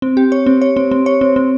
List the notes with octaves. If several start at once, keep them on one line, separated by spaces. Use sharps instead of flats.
C4
G4
C#5
C4
C#5
C4
C4
C#5
C4
C4